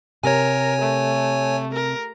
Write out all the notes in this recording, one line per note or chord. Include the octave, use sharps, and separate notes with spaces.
C3 A#4 C#5 G#5
A3
A#4